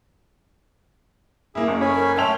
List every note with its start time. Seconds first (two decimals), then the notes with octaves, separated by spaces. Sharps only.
1.55 A#3 E4 G#4
1.68 F#1 G#4
1.81 C#4 A4 C#5 G#5 B5
1.95 A#4
2.17 A3 C#5 E5 G5 A5 C6 E6 F7